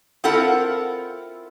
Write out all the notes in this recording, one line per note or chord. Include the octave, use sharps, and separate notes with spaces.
C4 E4 F4 A4 A#4 F#5